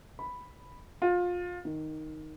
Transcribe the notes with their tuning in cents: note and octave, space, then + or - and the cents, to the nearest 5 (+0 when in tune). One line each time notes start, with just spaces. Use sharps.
B5 +0
F4 +25
D#3 +0